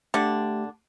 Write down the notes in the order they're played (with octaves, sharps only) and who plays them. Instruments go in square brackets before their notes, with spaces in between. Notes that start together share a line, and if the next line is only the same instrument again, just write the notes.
[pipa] D3 D4 [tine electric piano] A3 G4